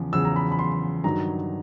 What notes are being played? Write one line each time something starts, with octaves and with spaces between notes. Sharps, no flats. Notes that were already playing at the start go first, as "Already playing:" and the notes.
Already playing: E2 C#3 F3
E2 C#3 F3 E6
A#5
B5
B5
C6
G2 D#3 F#3 A#5